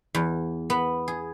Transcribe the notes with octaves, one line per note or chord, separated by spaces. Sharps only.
E2
B3
G#4